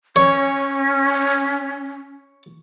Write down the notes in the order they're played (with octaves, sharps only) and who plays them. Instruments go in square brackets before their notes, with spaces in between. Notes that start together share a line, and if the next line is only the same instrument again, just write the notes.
[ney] C#4 [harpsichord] C#5